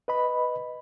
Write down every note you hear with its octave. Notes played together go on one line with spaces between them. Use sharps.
B4 D#5 B5